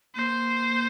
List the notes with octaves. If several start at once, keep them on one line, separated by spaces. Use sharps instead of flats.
A#3 C5